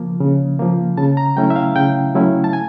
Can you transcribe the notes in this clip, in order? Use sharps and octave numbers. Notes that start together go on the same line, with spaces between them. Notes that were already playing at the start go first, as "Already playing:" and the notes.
Already playing: C#3 F3 A#3
C#3
F3 A#3
C#3 A5
A#5
F#3 A3 C#4 E4 G5
E5
F5
C#3 G5
F#3 A3 C#4 E4
A5
G#5